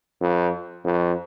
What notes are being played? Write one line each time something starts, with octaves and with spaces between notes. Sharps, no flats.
F2
F2